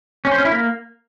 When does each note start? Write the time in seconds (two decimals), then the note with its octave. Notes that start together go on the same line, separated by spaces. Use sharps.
0.25 C#4
0.31 C5
0.38 C#4
0.45 E4
0.52 A#3